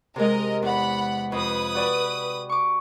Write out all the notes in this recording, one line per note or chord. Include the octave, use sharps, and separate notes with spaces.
C3 G#3 A#4 D#5
E2 F#5 B5
F2 B4 D#6
F#4 D5 G5
C#6 D6